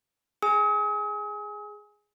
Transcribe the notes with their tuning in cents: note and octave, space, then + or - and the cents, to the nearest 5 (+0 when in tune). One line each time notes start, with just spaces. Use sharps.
G#4 +0 G#5 +0 D#6 +40